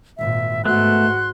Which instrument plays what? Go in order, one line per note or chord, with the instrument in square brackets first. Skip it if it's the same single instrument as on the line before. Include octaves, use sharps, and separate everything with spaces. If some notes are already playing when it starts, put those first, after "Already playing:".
[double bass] G#1 A#2 [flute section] E5
[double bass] G#2 [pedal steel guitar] A3 B3 [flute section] F#4 C6 F#6